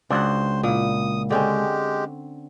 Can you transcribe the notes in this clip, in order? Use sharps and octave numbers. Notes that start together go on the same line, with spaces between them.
C#2 D4 F#4 C5 F#5
A#2 E4 D#6
D3 G#3 C4 C#4 G4